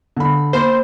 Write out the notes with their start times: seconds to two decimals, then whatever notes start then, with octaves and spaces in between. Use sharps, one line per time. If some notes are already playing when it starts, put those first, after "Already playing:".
0.17 D3 B5
0.53 A#3 C5 B5